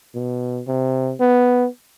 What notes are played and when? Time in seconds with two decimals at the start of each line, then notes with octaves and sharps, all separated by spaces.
0.15 B2
0.67 C3
1.20 B3